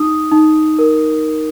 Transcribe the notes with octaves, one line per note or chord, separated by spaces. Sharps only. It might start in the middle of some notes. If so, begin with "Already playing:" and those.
Already playing: D#4 D#6
D#4
A#4